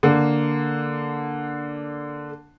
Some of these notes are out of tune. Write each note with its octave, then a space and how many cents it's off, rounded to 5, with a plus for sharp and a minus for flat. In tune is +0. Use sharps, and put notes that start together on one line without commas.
D3 +0 A#3 +0